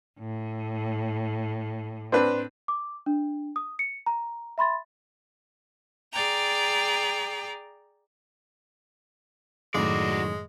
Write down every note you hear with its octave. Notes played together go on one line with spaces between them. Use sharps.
A2
C4 D4 B4
D6
D4
D#6
C#7
A#5
E5 B5 C6 A6
G#4 D5 G5 A#5
F#2 A2 D#3 G#3 F#4 D5